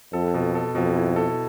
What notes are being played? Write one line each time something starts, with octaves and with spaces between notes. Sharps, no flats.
F2 A4
B2
A4
F2 B2
E4
A4